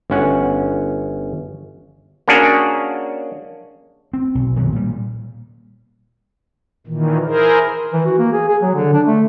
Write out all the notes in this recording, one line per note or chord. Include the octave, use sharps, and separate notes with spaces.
G1 C#4 F#5
A#3 C#4 D4 F#4 G#4 C#5
C4
B1
B2 D#3 F3 F#3
A#2 G3
A#2 D#3 E3
E4 G#4 A#4 C5
E3
F#4
A#3
G#4
G#4
F#3
D3
D4
A3